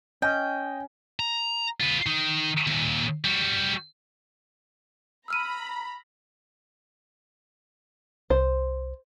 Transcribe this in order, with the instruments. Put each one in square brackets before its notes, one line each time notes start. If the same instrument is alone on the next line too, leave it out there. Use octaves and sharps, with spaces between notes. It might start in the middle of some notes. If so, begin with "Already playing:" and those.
[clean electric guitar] C#4 [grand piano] D#5 [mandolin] G5
[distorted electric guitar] A#5
F4 B4
D#3 D#4
D#2 A#2
G3 F#4
[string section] A#5 B5 [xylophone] E6 F6 D#7
[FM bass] C2 [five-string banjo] C5